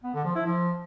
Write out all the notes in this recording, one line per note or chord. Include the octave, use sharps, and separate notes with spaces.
B3
D3
F3
E4
F3